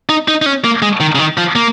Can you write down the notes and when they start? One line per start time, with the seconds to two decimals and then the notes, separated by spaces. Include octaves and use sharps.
0.09 D#4
0.28 D#4
0.42 D#4
0.46 C#4
0.64 A#3
0.82 G#3
1.00 D#3
1.15 C#3
1.19 D#3
1.38 F3
1.55 A#3